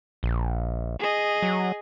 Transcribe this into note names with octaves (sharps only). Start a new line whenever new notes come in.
A#1
G#4 D#5
F#3